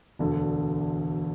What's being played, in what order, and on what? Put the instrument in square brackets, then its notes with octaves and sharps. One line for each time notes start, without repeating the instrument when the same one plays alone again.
[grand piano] E1 D2 D3